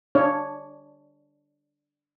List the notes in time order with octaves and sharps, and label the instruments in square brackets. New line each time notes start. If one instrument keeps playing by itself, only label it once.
[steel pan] D4 C#5